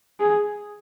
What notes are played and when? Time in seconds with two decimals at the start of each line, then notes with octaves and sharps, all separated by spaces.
0.20 G#4